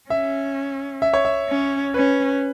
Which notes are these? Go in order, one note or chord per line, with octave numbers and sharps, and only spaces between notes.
C#4 E5
E5
C#5
E5
C#4
C#4 B4